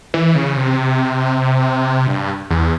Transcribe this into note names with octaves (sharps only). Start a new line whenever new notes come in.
E3
C#3
C3
G2
E2